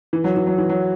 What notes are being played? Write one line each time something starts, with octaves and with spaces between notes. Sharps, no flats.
E3
F#3
E3
F#3
E3
F#3